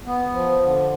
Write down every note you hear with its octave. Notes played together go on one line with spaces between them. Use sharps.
B3
F3
D3